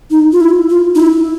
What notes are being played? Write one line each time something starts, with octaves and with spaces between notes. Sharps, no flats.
D#4
F4
E4
F4
D#4
E4